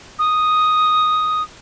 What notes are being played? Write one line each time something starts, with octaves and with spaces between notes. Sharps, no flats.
D#6